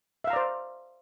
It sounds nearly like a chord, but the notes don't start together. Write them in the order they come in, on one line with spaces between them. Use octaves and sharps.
E5 F5 A#5 D5 C5